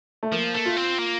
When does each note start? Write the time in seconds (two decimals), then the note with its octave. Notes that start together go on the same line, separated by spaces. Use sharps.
0.23 A3
0.32 F3 A#3
0.54 A3
0.65 F4
0.77 C4
0.99 A#3